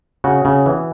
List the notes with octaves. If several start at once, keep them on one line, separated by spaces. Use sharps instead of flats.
C#3 F#4
C#3
E3